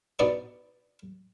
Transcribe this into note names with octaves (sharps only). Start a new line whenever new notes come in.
B2 B3 D#4 D5 C#6